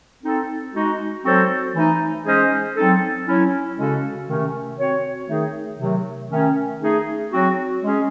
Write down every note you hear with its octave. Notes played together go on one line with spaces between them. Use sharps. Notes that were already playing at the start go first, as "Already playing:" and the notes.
C4 D#4 A4
G#3 D#4 F#4
F#3 C4 F#4 A4 C5
E3 A3 D#4
G#3 C#4 G#4 C5 D#5
F#3 C4 D#4 A4
F#3 C#4 E4
C#3 G#3 C#4 F#4 A4
C3 D#3 A3 C#4
C4 F#4 C#5
D#3 A3 D#4 G#4
C3 D#3 F#3 A3
D#3 A3 C#4
A3 D#4 G#4
F#3 C4 F#4
G#3 C#4 G#4